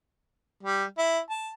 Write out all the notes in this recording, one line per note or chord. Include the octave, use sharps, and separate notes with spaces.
G3
E4
A5